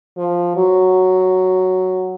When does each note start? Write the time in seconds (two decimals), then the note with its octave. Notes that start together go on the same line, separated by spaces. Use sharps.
0.17 F3
0.56 F#3